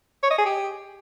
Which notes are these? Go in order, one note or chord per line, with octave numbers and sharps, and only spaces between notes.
C#5
D#5
G#4
G4